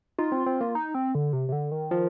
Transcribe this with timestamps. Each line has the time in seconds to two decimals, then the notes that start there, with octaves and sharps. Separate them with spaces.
0.19 D#4 F4
0.32 C4
0.46 C4
0.61 A#3
0.75 D#4
0.94 C4
1.15 D3
1.33 C3
1.49 C3
1.52 D3
1.71 D#3
1.91 F3